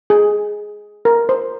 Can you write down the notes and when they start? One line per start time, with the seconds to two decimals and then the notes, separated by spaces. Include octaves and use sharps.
0.10 G#4
1.05 A#4
1.29 C5